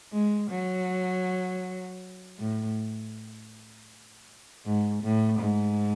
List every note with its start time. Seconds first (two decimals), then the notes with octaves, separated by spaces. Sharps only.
0.13 G#3
0.50 F#3
2.39 A2
4.65 G#2
5.03 A2
5.40 G#2